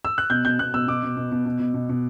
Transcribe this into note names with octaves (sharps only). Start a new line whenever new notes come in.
E6
F#6
B2 G6
B2 G6
B2 F#6
B2 E6
B2 D6
B2
B2
B2
B2
B2
B2
B2